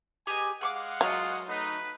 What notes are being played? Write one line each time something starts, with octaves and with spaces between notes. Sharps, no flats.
G4 G#4 B4 D#5 G#5
G#3 G#4 F5 F#5 C#6 D6
F#3 F4 C#5 D#5
A3 D#4 B4